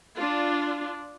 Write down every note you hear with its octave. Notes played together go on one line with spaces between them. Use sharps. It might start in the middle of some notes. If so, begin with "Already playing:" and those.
D4 F4